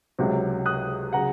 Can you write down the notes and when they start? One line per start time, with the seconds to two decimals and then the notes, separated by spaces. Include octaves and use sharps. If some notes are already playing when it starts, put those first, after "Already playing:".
0.18 C#2 C3 F#3
0.66 D#6 F#6
1.13 C#3 F#3 F#5 A#5